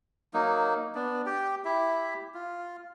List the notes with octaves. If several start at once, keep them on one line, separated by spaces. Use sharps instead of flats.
F#3 A#3 D#4
B3 D4
G4 G5
E4 G4 E5
F4